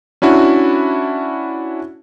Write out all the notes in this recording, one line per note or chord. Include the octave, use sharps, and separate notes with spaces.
C#4 D4 E4 F#4